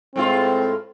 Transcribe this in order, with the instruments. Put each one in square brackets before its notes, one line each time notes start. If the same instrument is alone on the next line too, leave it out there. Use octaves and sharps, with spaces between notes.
[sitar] A2 G#3 F4 [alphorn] C4